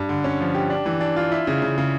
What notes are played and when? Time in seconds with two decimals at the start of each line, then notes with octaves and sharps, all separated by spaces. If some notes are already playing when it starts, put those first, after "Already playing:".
Already playing: G2
0.09 D3
0.24 C#4
0.40 F3
0.54 G4
0.70 D4
0.86 E3
1.01 D4
1.16 F4
1.32 E4
1.47 C#3
1.62 C#3
1.78 C#3